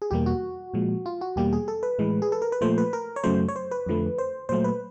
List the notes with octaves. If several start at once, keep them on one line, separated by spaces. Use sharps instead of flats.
G#4
E2 B2 G3 A#3 G4
F#4
A#2 F3 G#3
F4
F#4
E2 B2 G3 A#3 G4
G#4
A4
B4
A2 E3 G#3
G#4
A4
A#4
B4
A#2 F3 A3 C5
B4
A#4
C#5
F#2 C#3 F#3 A3 C5
C#5
C5
B4
F2 D3 F3 A3
C5
A#2 F#3 A3 C5
B4